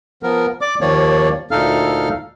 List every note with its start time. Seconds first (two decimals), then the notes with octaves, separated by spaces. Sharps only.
0.23 F3 B3 A#4
0.61 D5 D6
0.81 D#2 D#3 F3 A#3 C#5 D5
1.51 D2 A#2 D#4 A4 F5 F6